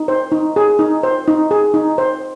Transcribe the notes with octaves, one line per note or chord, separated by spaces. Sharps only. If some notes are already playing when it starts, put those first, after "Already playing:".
Already playing: D#4
C5
D#4
G#4
D#4
C5
D#4
G#4
D#4
C5